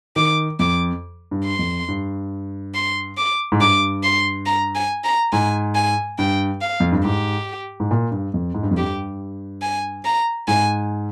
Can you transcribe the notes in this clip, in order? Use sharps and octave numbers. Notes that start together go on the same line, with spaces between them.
D#3 D6
F2 D6
G2
C6
F2
G2
C6
D6
G#2
G2 D6
C6
A#5
G#5
A#5
G#2 G#5
G#5
G2 G5
F5
F2
G2
G#2 G4
G#2
A#2
G2
F2
G#2
G2
F2
G2 G4
G#5
A#5
G#2 G#5